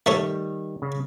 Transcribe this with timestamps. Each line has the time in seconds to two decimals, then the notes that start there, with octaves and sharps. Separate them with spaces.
0.06 D#3 G3 A3 A4 C#5
0.82 C#3